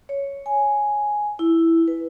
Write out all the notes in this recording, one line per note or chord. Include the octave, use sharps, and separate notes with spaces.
C#5
G#5
E4
B4